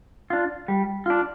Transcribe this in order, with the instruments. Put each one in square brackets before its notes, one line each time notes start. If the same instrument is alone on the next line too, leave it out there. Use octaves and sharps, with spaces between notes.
[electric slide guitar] D4 F4
G3
D4 F4